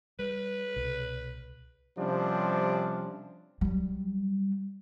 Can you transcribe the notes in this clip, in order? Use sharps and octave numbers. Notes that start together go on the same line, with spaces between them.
G3 B4
C2 B2
C3 F3 G3 C#4 D4
F#3 G3